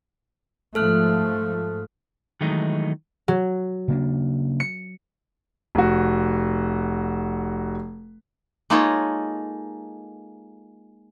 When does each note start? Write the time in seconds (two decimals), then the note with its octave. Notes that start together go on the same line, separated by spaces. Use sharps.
0.75 G#2 F3 A3 A4 F6 F#6
2.41 D#3 E3 F#3 G#3 A3 D#4
3.28 F#3
3.88 C#3 A#3 D4
4.60 C#7
5.75 F1 F#4
8.70 G#3 A#3 D#4 F4 A4 C#5